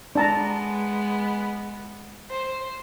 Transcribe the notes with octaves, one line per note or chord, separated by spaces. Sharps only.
G#3 B3 D4 A5 A#5
C5